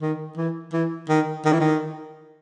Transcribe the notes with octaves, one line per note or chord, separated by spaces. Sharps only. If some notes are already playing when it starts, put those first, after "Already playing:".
D#3
E3
E3
D#3
D#3
E3
D#3